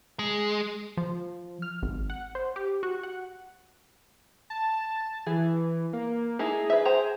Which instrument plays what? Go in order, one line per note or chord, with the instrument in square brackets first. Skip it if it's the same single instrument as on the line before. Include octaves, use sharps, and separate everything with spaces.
[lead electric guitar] G#3
[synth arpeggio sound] F3
F6
G#1
F#5
C5
G4
F#4
F#5
[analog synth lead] A5
[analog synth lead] E3 [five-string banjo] G#4
[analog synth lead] A#3
[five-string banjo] A3 D#4 E4 [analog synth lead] G#4
[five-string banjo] B4 E5
C5 G5 A#5